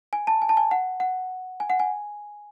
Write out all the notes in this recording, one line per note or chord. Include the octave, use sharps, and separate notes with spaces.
G#5
A5
G#5
A5
G#5
F#5
F#5
G#5
F#5
G#5